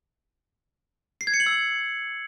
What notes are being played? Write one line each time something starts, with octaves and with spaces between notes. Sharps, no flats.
C7
G#6
C#7
F#7
E6